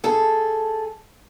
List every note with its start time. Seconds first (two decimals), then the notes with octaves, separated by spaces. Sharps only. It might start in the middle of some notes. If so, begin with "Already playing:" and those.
0.04 G#4 A4